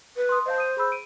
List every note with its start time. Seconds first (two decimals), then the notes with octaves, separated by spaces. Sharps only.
0.17 B4
0.29 C6 D#6
0.46 C5 D#5 F5 A5
0.58 D#6 D#7
0.77 G#4 B5 E6
0.92 D7 D#7